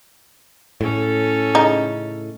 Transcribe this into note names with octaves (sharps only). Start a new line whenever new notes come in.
A2 C#4 A4
C#3 D#4